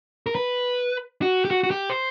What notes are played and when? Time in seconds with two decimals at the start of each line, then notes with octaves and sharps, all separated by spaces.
0.26 A#4
0.35 B4
1.22 F#4
1.45 G4
1.51 F#4
1.63 F#4
1.71 G4
1.90 C5